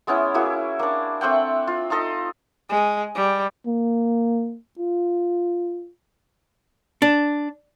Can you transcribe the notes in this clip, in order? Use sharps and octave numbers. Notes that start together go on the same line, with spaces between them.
G#3 B3 C#4 E4
A#3 E4 F#4 G#4
A#3 D4
A3 C4 F#5 G5
F4
D#4 F4 A4 D#5
G#3
G3
A#3
F4
D4